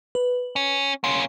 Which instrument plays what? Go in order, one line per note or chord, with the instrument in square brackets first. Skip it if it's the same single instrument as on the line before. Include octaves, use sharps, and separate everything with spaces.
[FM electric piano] B4
[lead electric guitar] C#4
[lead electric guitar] A#3 C#4 [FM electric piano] C6